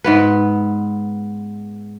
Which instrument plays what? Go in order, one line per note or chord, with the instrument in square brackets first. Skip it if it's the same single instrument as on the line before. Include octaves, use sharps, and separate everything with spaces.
[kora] G#2 B3 B4